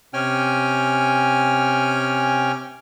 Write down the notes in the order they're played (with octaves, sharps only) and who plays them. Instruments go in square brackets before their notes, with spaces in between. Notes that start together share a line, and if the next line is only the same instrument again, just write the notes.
[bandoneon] C3 C#4 G5 G#5 F6